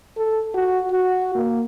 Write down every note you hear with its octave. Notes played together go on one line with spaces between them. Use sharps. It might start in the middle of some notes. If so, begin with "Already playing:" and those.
A4
F#4
F#4
A#3